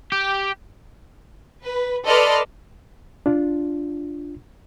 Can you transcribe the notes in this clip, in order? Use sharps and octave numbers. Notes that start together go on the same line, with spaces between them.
G4
B4
A4 B4 D5 D#5 C6 F6
D4 F4